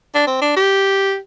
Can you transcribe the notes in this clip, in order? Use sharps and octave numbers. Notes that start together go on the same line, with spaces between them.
D4
C4
D4
G4